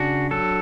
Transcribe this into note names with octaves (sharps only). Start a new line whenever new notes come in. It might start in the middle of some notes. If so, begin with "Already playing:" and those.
Already playing: C#3 D4 F#4
F#3 A4